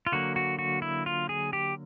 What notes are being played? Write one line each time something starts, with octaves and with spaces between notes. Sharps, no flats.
F4
D3 F#3 A#3 F#4
F#4
F#4
E4
F4
G#4
G4